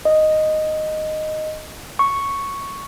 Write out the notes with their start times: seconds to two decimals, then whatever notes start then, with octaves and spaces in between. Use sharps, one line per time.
0.05 D#5
1.99 C#6